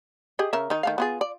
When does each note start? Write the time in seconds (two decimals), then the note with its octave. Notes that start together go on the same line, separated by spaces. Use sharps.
0.39 G4 G#4 D#5
0.53 C#3 A#4 E5
0.70 D#3 D#4
0.83 D#3 A3 F5
0.98 B3 F4 G#4
1.21 D5